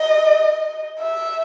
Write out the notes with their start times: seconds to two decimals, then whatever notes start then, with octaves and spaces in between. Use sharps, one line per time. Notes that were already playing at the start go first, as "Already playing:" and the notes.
Already playing: D#5
1.00 E5